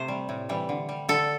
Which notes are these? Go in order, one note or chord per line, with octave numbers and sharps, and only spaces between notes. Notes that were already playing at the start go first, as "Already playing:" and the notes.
Already playing: C3 A3 G4 C5
G3
A2
E3 G3
D3
G3
D3 A4